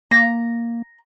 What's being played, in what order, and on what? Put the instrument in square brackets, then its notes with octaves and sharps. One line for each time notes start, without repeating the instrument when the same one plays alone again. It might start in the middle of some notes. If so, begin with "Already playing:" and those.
[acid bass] A#3 [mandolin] A#5